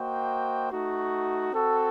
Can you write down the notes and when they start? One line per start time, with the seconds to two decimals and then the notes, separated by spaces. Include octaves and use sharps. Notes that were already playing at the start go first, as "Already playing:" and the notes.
Already playing: A#3 F#4 C5 D#5 G5
0.71 A3 D#4 F#4
1.51 C4 F#4 A4